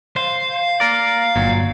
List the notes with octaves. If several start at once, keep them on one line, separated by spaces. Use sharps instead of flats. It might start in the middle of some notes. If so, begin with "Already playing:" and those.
C5 F5
A#3 A#4 D5
G1 A#2 F#3